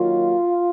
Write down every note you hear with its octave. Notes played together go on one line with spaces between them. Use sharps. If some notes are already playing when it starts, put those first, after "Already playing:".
Already playing: D#3 F#3 A#3 F4